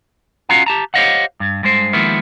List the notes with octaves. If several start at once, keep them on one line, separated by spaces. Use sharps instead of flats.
C#4 F4 F#4 F5 F#5 A#5
G4 A5 A#5
G4 C5 C#5 D#5 F5 F#5
G2
G2 G#3 C5
D#3 F3 G#3 A#3 B3 E4